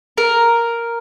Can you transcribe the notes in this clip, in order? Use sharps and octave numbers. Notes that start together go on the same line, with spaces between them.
A#4